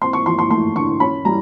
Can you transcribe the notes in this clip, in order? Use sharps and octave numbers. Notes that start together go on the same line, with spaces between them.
C4 C6
C#6
F3 C6
C6
A3 C6
D3 C#6
C#4 B5
G3 A#5